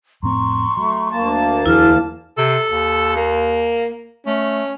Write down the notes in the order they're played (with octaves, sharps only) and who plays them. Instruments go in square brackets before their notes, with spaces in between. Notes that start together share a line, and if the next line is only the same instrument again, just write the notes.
[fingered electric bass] F2 A2 C4 [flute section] A#5 C6 C#6
[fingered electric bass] F#3 [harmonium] A3
[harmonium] D2 A#3 A5
[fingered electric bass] E2 F#3 [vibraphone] E4 [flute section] G#4 F6
[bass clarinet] C3 [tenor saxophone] A4
[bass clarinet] D#2
[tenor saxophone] A#3
[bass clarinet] A3 [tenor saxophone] C#4